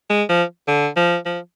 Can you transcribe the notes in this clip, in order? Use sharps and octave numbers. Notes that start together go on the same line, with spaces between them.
G#3
F3
D3
F3
F3